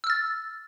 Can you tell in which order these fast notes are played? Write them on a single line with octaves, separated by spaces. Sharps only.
E6 F6 A6